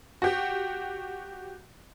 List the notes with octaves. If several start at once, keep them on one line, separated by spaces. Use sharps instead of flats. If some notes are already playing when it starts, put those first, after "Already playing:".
F#4 G4